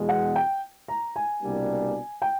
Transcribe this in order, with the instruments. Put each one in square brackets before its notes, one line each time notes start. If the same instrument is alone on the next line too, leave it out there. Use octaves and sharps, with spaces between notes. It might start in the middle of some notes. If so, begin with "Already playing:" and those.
Already playing: [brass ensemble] E2 B2 G#3
[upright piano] F#5
G5
A#5
G#5
[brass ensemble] C2 B2 G3 A#3 D4
[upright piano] G5